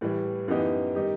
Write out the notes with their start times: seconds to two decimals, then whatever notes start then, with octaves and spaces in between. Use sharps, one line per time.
0.01 A2 E3 G3
0.48 F#2 E3 B3 D#4 G4
0.95 D#3 G3 D#4 G4